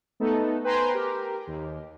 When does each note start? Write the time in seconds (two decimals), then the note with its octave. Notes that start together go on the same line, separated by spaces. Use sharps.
0.20 A3 B3 D#4 A4
0.64 B4 C5 G5 G#5 A#5 C6
0.94 G4 A#4
1.47 D#2